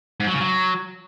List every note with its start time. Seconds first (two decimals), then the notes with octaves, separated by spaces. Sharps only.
0.20 G#2
0.27 F#3
0.34 C#3
0.40 F#3